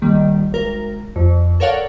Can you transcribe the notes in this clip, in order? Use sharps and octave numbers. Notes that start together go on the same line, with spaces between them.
A#1 D#3 G3
G#1 A#4
F2
A4 A#4 C#5 D5 F5 F#5